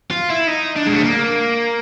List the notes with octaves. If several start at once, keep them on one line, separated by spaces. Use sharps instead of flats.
F4
E4
D#4
D4
G#3
A3
A#3